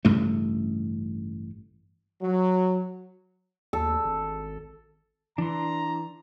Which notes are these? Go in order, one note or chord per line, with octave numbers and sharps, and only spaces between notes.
A1 G2 C#3 A3
F#3
D#2 A4
G#1
E3 D4 A#5 C6